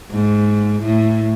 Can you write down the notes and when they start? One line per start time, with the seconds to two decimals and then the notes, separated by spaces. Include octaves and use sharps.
0.11 G#2
0.82 A2